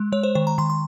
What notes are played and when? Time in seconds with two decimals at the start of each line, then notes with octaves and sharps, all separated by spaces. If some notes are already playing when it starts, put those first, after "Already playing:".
Already playing: G#3
0.12 G#3 C#5
0.23 C5
0.35 D#3 C5
0.47 A#5
0.58 D#3 C6
0.70 C6